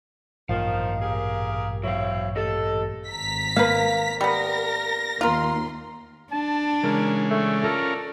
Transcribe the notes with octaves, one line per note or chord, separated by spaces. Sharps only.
A1 G2 A#2 D#3 F3 F5
G4 G#4 A#4
F#3 C4 E4 C#5 F5
A3 G4 A4 D#5
G#1 A#5 B6
A#3 B4 F5
G3 B3 A#4 A#6
D#2 F4 A#4 C6
D4 A5
C#3 E3 G#3 A#4
A3 D5
C#4 F4 A4 A#4